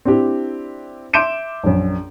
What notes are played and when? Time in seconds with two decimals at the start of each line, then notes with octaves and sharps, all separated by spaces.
0.05 C4 D4 E4 G4
1.13 E5 C6 D6 G6 D7 E7
1.64 A#1 F#2